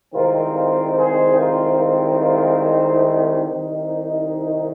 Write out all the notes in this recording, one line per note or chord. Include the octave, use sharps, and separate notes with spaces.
C2 C3 D#3 G#3 C4 F4 A#4
F4 A#4
G#4 C5
F4 A#4
F4 A#4
F4 A#4
D#4
C2 C3 D#3